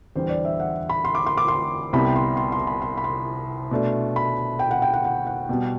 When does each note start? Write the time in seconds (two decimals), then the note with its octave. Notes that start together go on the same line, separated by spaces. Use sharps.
0.16 E2 D3 G3 C5
0.29 D5
0.45 E5
0.60 F#5
0.89 B5
1.05 C6
1.15 D6
1.26 C6
1.37 D6
1.48 C6
1.93 C2 C3 G3 B3 B5
2.16 C6
2.37 C6
2.52 C6
2.67 B5
2.82 C6
2.97 B5
3.04 C6
3.71 B2 A3 D4
4.16 B5
4.59 G5
4.71 F#5
4.82 G5
4.94 F#5
5.05 F#5
5.27 F#5
5.49 B2 G3 B3